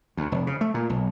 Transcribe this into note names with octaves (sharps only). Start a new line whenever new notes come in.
D2
F1
C#3
A3
A#2
B1